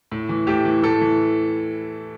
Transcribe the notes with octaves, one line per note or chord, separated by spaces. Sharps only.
A2
E3
A2 G4
E3
A2 A4
E3